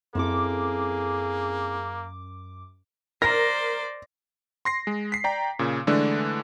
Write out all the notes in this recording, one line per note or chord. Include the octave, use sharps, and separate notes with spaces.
F#2 A#3 C4 E4 G#4 A4 D6
A#4 C5 D5 A#6
C6 A#6 C7
G#3
B6 C7
D5 G5 A#5
A#2 C#3
D3 E3 G#3 A3 D4